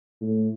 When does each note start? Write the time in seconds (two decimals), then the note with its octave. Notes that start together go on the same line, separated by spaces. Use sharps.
0.21 A2